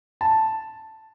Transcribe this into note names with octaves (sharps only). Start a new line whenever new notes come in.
A5